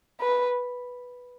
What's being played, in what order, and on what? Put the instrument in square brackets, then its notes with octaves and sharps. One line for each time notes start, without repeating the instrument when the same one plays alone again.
[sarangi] B4